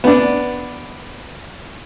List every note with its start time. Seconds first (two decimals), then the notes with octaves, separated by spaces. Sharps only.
0.04 B3 D4